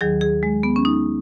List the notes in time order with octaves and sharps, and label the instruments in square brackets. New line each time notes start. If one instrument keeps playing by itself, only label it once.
[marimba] D#2 D#3 F#3 G#4
G#4
G#3
B3
C#4
D#4